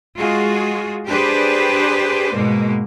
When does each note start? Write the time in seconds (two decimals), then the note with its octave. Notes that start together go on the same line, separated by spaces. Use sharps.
0.17 G#3 F4 F#4 G#4
1.07 D4 G4 G#4 B4 C5 D5
2.33 G#2 B2 G#3 A#3